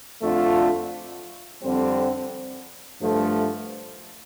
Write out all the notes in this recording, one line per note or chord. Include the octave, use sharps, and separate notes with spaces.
F2 D3 A3 D4 F4
F2 D3 G3 C4
G2 D3 F3 A3